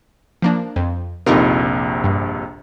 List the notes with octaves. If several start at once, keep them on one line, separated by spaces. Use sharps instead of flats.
F3 A#3 D4
F2
A#1 F2 C3 D#4 F4 A#4
G2